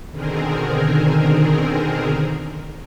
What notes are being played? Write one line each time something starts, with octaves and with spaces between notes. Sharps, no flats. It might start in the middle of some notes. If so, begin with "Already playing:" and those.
B2 D3 D#3 C4 G#4 A#4